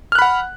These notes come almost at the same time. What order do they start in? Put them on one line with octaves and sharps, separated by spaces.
F6 F#6 B5 F#5